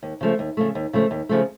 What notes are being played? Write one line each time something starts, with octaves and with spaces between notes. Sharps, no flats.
D#2
C#3 F3 A3
D#2
C#3 F3 A3
D#2
C#3 F3 A3
D#2
C#3 F3 A3